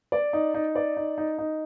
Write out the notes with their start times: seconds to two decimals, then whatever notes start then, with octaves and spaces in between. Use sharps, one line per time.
0.12 D5
0.33 D#4
0.54 D#4
0.75 D5
0.97 D#4
1.18 D#4
1.38 D#4